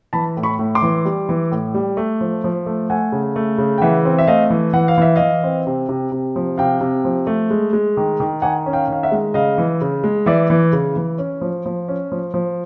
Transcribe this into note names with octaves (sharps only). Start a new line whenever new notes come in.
E3 A5 B5
A2
B5 C#6
A2
C6 D6
E3
G3
E3
A2
G3
A3
F3
F3
A3
A3 F#5 G#5
C#3
A3
C#3
G5
E3 E5 F#5
C4
E5
A3 D#5 F5
E3
E3 F#5
F5
E3 E5
E3 D#5 F5
C4
C3
C3
C3
F3
C3 F5 G5
C3
F3
A3
G#3
G#3
D#3
D#3
D#3 F#5 G#5
C#4
F5 G5
D#3 F5
E5 F#5
G#3
C#3 D#5 F5
E3
C#3
G#3
E3 D5 E5
E3
C#3
E3
C#4
F3
F3
C#4
F3
F3